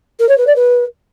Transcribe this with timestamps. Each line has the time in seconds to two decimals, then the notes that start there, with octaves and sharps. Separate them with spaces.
0.19 A#4
0.28 C#5
0.37 B4
0.46 D5
0.55 B4